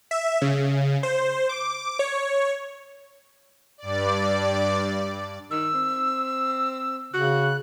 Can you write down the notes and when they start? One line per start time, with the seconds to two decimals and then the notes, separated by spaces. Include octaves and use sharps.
0.11 E5
0.42 C#3
1.03 C5
1.49 D6
1.99 C#5
3.78 G2 D5
5.51 D#3 E6
5.74 C4
7.14 C#3 F#4 F#6